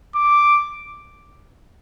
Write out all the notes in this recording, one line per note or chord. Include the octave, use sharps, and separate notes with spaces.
D6